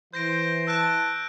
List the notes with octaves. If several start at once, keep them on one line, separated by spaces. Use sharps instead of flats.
E3 C5 G6 A#6 D7
A5 E6 F#6 D7